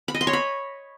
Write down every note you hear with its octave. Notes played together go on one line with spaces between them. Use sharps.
B5
D#5
C6
C#5
B5